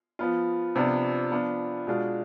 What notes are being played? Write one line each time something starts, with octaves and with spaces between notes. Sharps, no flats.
F3 B3 F4
C3 F3 B3 D4 F4
F3 B3 D4 F4
B2 G#3 D4 F4